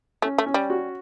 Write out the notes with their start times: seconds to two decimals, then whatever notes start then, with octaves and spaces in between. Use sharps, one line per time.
0.22 A3 C#4
0.38 A3
0.46 C#4
0.54 G3
0.70 F#4